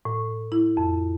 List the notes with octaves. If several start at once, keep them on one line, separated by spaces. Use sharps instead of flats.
A2
E4
F2